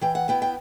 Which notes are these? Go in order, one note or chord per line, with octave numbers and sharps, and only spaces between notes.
E3 G5
F#5
B3 E4 G5
G5